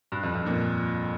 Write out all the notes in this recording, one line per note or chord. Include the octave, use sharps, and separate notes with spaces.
G2
F2
F2
A#2